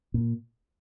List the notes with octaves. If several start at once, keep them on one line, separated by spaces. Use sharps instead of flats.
A#2